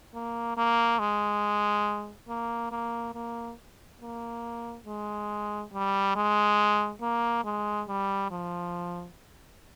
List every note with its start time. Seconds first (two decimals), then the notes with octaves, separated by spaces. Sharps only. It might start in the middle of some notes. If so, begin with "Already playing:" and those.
0.14 A#3
0.57 A#3
0.99 G#3
2.28 A#3
2.72 A#3
3.14 A#3
4.00 A#3
4.86 G#3
5.73 G3
6.16 G#3
7.01 A#3
7.44 G#3
7.88 G3
8.31 F3